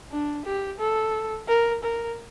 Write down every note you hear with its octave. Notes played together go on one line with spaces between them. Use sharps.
D4
G4
A4
A#4
A#4